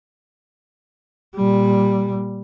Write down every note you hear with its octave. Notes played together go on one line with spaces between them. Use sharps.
A#2 G3